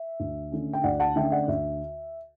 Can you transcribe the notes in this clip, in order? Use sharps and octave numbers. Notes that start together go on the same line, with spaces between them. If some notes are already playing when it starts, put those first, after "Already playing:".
Already playing: E5
D2
D3 A3 C#4
G5
D2 D5 F#5
F#5 A5
D3 A3 C#4 E5 G5
D5 F#5
D2 E5